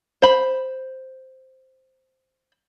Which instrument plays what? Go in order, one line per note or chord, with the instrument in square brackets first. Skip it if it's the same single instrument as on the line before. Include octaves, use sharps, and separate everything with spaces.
[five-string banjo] C5 B5